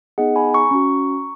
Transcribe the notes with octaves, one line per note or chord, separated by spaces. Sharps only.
B3 D#4 G#4 D#5 F#5
G#5 B5
A#5 C#6
C#4 F#4